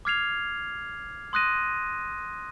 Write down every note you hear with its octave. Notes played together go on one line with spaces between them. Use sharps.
D6 F6 G#6 C7 F7
C6 D#6 F#6 A#6 D#7